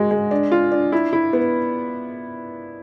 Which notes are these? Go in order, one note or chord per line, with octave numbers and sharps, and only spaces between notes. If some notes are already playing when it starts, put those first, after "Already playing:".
Already playing: G#3 F#4
G#3
D4
F4
D4
E4
E4
B3